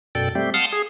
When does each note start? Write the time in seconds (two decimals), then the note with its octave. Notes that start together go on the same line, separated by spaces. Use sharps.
0.15 F#2 B2 A4 D5 G5
0.35 G3 A3 C4 G4
0.54 F5 F#5 A5 C6 D#6 F6
0.72 G#4